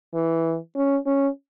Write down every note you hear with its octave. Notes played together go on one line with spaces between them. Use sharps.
E3
C#4
C#4